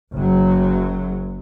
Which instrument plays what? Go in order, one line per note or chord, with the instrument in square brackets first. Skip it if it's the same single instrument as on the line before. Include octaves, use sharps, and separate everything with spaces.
[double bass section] F#1 F#3